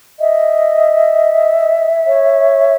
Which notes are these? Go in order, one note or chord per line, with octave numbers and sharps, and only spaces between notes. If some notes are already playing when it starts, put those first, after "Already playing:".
D#5 E5
C#5